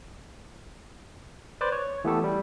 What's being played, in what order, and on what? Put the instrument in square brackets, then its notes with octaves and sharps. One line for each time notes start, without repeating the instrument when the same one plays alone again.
[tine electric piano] B4 C5 D5 D6
C#5
E3 A3 B3 E4 G4 A4
G3